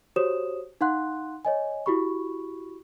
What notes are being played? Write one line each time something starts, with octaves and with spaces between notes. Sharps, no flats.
F#4 G4 C5 C#5 D#6 E7
D#4 F5 F#5 C6 F#6
C#5 D#5 G#5
E4 F#4 G4 B5 C#6